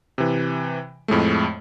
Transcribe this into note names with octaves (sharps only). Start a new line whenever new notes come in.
C3 E3
F2 A2 G#3 A3